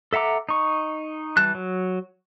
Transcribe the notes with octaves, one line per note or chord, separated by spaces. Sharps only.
A4 E5 F#5 A#5 D6
D#4 C#6
E3 G3 A5 F#6
F#3